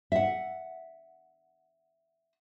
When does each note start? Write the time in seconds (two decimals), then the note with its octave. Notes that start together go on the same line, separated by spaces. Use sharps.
0.12 E5 F#5